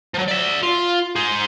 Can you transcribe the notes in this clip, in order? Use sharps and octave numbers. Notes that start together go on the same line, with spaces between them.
F3 F#3
D5 E5
F4
G#4 C5